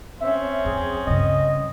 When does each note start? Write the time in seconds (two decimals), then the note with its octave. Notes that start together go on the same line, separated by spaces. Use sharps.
0.21 C4 C#4 E5
0.65 F2 G#4
1.07 G2 C#3 D#5